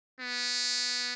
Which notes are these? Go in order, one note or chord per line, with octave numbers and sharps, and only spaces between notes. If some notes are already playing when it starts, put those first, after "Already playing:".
B3